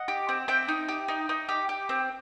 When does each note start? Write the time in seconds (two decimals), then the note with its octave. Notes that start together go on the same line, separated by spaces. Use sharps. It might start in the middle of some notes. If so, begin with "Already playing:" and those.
Already playing: D#5 F#5
0.08 G4
0.29 C4
0.48 C4 E5 G5
0.69 D#4
0.89 G4
1.08 D#4
1.29 D#4
1.49 G4
1.69 G4
1.89 C4